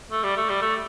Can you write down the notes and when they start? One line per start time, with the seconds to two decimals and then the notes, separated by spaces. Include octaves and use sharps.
0.11 A3
0.23 G3
0.37 A3
0.49 G3
0.62 A3